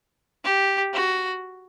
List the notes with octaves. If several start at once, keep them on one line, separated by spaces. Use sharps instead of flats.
G4
F#4